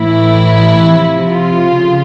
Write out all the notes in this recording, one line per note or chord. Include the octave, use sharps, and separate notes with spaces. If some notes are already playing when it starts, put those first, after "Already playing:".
Already playing: A2 E3 E4
C3 F3
F4
C#3